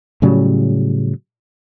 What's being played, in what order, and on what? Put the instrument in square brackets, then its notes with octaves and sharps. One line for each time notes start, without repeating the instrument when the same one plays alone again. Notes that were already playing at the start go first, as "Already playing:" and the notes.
[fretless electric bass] A2 C#3 F#3 G3